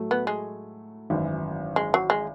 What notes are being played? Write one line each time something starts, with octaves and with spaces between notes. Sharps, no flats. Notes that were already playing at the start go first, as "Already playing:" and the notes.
Already playing: A2 F#3 A3
B3
G#3
G#1 F#2 E3
G#3
F#3
G#3